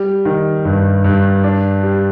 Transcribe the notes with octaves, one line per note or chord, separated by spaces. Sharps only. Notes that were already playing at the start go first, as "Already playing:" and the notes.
Already playing: G3
D#3
G2
G2
D4
G3